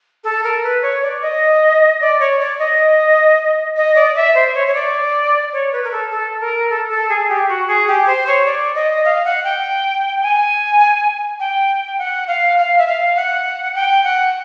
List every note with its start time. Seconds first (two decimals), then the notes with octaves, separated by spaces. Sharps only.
0.24 A4
0.44 A#4
0.63 B4
0.82 C#5
1.02 D5
1.22 D#5
2.00 D5
2.20 C#5
2.39 D5
2.58 D#5
3.76 D#5
3.95 D5
4.15 E5
4.35 C5
4.54 C#5
4.67 C#5
4.74 D5
5.52 C#5
5.72 B4
5.84 A#4
5.92 A4
6.11 A4
6.40 A#4
6.70 A4
6.89 A4
7.09 G#4
7.28 G4
7.48 F#4
7.67 G#4
7.87 G4
8.06 C5
8.26 C#5
8.45 D5
8.75 D#5
9.04 F5
9.24 F#5
9.44 G5
10.22 G#5
11.39 G5
11.98 F#5
12.27 F5
12.57 F5
12.78 E5
12.87 F5
13.16 F#5
13.75 G5
14.04 F#5